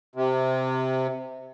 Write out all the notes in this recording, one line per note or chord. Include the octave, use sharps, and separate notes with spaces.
C3